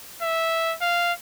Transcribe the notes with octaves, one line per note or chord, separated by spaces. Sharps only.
E5
F5